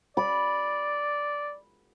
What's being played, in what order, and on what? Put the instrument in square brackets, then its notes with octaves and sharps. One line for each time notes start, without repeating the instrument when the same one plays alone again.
[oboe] D5 [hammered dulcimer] B5